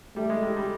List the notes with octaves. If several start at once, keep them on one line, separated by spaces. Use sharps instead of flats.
G3 A3
G#3
G3
G3